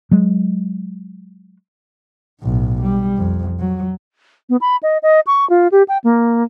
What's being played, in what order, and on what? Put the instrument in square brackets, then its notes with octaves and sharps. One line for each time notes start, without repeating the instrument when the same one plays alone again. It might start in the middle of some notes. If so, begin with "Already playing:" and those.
[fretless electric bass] F#3 G#3
[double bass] B1 A2
G3
F2
F#3
[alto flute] B3
B5
D#5
D#5
C#6
F4
G4
G5
A#3